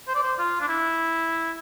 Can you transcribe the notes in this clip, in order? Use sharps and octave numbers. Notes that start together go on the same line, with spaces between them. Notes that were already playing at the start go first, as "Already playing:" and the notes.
C5
D5
C5
F4
D4
E4